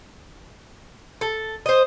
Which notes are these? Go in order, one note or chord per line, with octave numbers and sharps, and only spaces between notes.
A4
C5 D#5